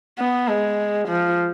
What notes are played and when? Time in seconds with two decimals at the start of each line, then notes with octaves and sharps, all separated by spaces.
0.19 B3
0.48 G#3
1.08 F3